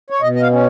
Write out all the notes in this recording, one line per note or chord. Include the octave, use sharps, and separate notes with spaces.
C#5
B2 D#5
D#5
F5
C#4